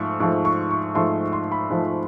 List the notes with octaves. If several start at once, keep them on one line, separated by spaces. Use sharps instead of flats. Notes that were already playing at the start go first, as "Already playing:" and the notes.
Already playing: G#2 F3 A3 C#6
G#2 F3 A3 C#6
C#6
C#6
G#2 F3 A3 C6
C6
B5
G#2 F3 A3